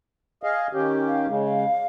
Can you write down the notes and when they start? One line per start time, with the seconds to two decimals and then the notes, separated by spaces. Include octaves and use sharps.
0.43 G#4 D#5 F5
0.73 D#3 C#4 G4
1.07 F5
1.28 C#3 G#3
1.44 F5